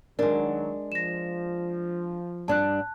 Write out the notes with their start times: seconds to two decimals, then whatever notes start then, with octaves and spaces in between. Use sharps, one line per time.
0.19 D#3 F#3 G#3 D4 A#4
0.92 F3 A#6 E7
2.48 G2 D4 A5 F#6